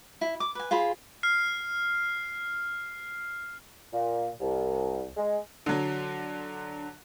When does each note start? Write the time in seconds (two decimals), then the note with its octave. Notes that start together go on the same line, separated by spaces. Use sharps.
0.21 E4
0.40 D6
0.55 B4 G#5
0.71 F4 G#4 C5 B5
1.23 F6 C7
3.93 A#2
4.40 C2
5.16 G#3
5.66 D3 F#3